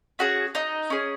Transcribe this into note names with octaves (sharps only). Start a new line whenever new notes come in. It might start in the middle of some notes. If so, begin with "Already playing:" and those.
C#4 F#4 G#4 F#5
D#4 D#5
C#4 G#4